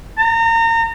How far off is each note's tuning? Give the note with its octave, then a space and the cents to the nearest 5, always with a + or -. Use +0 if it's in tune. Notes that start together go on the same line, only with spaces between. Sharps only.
A#5 -30